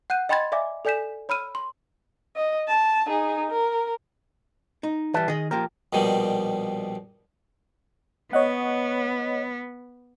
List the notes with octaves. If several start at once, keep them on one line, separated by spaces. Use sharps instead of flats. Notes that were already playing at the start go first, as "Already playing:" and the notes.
F#5 F#6 G6 D#7
D#5 G5 B5 C6 G#6 A6
D5 E5 F5 G#5 D6
A4 D5 G#5 G6 B6 E7
C#5 B5 E6 F6 D#7
C6
D#5
A5
D#4 G#4
A#4
D#4
E3 G3 B4 E5 A5
D#3 G#4 D#5
F3 A#3 G4 A#4
A#1 B2 D#3 G3
B3 C#5 D#5 F#5